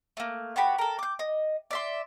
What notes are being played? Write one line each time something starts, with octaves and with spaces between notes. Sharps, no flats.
A3 A#3
B3 F#4 G4 B5
A4 A#4
D6 G6
D#5
D5 E5 C6